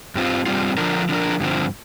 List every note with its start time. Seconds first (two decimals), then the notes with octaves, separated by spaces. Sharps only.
0.15 G2 G3 C4 F4
0.46 G2 G3 C4 F4
0.77 D3 F3 D4 A#4
1.09 D3 F3 D4 A#4
1.40 G2 D3 F3 C4